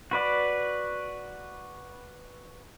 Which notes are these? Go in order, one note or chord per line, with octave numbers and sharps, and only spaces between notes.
F#4 B4 D5